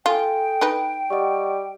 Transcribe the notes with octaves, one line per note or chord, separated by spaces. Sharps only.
F4 A4 G5 G#5
D#4 B4
G3 D#5 F#5 C#6